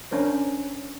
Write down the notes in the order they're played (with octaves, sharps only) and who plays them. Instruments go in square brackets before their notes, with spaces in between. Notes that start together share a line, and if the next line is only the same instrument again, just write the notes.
[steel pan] C#4 D4 A#4 C5